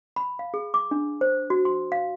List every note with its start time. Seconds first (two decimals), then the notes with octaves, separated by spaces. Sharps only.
0.16 B5
0.39 F5
0.54 G#4
0.74 D6
0.91 D4
1.21 C5
1.50 F#4
1.65 C6
1.92 F5